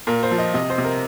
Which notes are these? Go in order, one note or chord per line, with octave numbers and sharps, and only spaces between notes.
A#2 A#4
C5
F3
D#5
C3 D#5
C5
C3
A#4